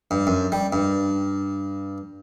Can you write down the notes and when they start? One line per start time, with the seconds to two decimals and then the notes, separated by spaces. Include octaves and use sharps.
0.11 G2
0.27 F#2
0.52 G3
0.73 G2